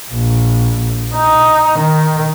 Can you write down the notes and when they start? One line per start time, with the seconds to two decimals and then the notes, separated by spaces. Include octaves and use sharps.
0.11 A#1
1.14 D#4
1.79 D#3